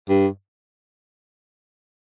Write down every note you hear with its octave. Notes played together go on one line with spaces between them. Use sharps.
G2